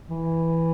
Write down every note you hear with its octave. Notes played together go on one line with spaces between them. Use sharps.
E3